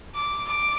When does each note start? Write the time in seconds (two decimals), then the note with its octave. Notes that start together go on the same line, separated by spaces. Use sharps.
0.15 D6
0.48 D6